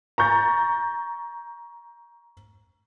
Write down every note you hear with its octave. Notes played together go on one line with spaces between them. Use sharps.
A#5 C#6 G6 A6